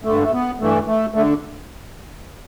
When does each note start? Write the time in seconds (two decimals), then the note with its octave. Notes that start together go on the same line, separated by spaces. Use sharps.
0.04 G2 D3 A3
0.23 A3
0.32 B3
0.60 G2 E3 A3
0.87 A3
1.14 D3 A3